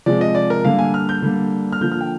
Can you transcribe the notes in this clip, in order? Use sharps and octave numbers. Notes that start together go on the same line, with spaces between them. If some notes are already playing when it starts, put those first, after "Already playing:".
C3 F3 G#3 D5
D#5
D5
A#4
D3 G3 A#3 F5
G#5
F6
G6
D3 G3 A#3
F6
D3 F3 A#3 G6
F6
G5